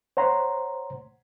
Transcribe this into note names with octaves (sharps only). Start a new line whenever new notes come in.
C5 C#5 F#5 A#5 C6